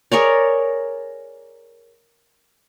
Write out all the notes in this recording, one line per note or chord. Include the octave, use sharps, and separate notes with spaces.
G#4 A#4 C#5 D5